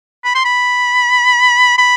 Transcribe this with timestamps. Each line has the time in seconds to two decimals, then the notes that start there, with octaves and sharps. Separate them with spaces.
0.25 B5
0.35 C6
0.45 B5
1.78 B5